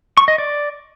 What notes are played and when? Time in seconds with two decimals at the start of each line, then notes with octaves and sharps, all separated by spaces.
0.17 C#6
0.28 D#5
0.38 D5